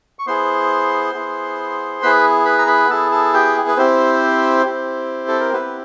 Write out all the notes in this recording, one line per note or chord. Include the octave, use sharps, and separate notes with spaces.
C#6
B3 E4 G#4 C5 C6
B3 E4 G#4
B3 E4 G#4 B4 B5
B4 B5
A#5
B4 B5
B3 E4 G#4 A4 A5
A4 A5
G4 G5
B4
C4 E4 G4 C5
C4 E4 G4
A4
A#4
B3 C4 E4 G4 B4